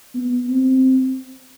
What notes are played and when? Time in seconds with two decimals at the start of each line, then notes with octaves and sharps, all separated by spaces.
0.14 B3
0.48 C4